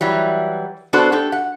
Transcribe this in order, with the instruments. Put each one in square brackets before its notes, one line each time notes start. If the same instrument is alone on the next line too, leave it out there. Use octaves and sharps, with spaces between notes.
[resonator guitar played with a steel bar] E3 F#3 G3
B3 D4 F#4 A4 C5
D4 G4 A4
F#5